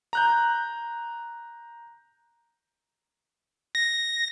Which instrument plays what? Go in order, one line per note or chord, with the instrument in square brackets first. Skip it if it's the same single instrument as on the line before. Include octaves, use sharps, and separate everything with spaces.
[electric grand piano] A#5 F#6 G6
[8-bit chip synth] A#6